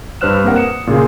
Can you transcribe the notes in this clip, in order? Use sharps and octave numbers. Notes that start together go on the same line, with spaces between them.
G2 B4 C5 F6 F#6 E7
A#3 C4 A#4 F#5
D#6 C#7 E7
A#2 C#3 F4 G#4